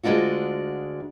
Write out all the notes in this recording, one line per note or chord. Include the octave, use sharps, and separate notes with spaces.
D2 G#3 A3 D4 F4 F#4